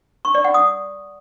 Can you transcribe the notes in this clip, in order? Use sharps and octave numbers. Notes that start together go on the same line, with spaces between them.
C#6
D5
F#5
D#6